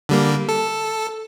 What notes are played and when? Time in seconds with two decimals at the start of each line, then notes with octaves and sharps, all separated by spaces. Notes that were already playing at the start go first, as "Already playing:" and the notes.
0.09 D3 G3 A#3
0.49 A4